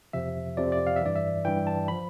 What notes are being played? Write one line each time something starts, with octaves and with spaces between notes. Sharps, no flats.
F2 C3 F3 E5
F2 C3 F3 D5
D5
F5
E5
G2 E3 D5
E5
G2 E3 G5
A5
F3 B5